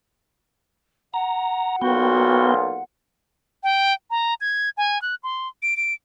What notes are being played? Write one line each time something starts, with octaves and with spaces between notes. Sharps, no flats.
F#5 A#5
B1 A#2 B3 F4 F#4 G5
G5
A#5
G#6
G#5
F#6
C6
D7
D7